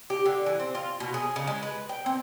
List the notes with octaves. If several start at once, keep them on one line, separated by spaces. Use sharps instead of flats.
G4
D3
E3
C4
F4
B2
G#4
C#3
G#3
B4
G5
C4